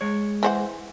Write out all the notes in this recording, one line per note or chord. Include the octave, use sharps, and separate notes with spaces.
G#3 C#5
E3 C5 F#5